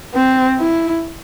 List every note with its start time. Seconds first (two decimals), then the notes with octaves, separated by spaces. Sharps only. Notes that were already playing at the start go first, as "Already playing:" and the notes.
0.14 C4
0.59 E4